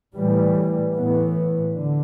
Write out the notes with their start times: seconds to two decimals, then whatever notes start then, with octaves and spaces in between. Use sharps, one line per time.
0.15 A2 E3 G3
0.94 A2 E3 B3
1.74 D3